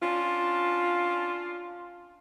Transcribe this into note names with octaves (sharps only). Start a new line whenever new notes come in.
C#4 D4 F4